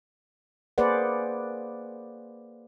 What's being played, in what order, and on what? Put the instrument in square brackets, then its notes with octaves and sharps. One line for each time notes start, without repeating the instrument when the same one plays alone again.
[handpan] A#3 G#4 B4 C5 D5 F#5